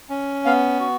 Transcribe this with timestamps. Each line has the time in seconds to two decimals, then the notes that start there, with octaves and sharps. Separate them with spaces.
0.10 C#4
0.45 B3 F5
0.80 F#4